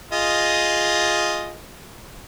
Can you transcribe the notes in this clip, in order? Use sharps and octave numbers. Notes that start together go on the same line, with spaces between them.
F4 G#4 D#5